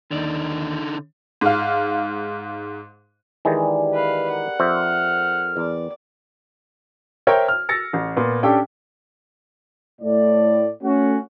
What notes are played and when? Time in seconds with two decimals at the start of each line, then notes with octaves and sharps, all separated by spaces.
0.11 D#2 D3 D#4 D5
1.41 G#2 F5
3.45 D#3 E3 G#3 D4 G4 G#4
3.94 B4 F5
4.31 A#4 F#5
4.60 F2 C5 E5 F6
5.57 E2 D5
7.27 A#4 C5 C#5 E5 G5
7.48 F6
7.69 E6 A6 A#6 C#7
7.93 A1
8.17 A#2 B3
8.43 C#4 D4 G4 A4 G5
10.01 A2 D5
10.82 A3 C#4 F#4